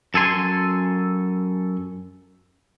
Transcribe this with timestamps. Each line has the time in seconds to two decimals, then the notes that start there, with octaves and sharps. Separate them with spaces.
0.14 F#2 A4 G#5 C6